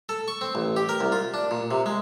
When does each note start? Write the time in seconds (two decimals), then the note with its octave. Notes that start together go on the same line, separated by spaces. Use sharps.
0.09 A4
0.28 C#6
0.41 C4
0.55 A1
0.76 G4
0.89 A#4
1.00 C2
1.12 F4
1.34 D4
1.51 A#2
1.71 C3
1.86 G#3